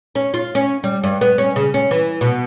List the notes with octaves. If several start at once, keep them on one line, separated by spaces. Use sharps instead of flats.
C#4
F4
C#4
G3
G2
B3
C#4
C#3
C#4
E3
B2